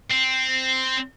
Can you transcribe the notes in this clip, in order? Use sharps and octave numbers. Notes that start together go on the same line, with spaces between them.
C4